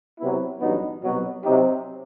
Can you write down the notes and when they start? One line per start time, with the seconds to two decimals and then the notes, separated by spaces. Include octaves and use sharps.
0.20 C3 F#3 B3 E4
0.61 A1 G2 F#3 B3 D#4
1.02 C2 B2 F#3
1.43 C3 F#3 C4 D#4 G4